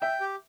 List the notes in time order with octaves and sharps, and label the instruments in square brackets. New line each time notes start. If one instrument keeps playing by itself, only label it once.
[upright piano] E5 [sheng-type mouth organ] G5
[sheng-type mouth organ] G4